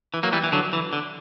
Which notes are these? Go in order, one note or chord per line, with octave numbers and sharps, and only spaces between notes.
E3
F#3 A#3
E3 G3
E3
D3 F#3
E3
D3